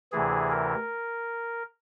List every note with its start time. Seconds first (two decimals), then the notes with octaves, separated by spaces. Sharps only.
0.12 D2 C3 E3 G#4
0.51 A#4